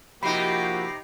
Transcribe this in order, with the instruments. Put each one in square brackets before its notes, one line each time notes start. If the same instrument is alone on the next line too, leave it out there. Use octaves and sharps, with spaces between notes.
[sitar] C3 D#4 [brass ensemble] F3 A#3 F#4 [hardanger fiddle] G4 [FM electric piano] B5 C7